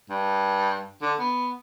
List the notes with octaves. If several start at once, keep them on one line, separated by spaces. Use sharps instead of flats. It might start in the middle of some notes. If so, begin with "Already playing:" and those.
G2
D3
B3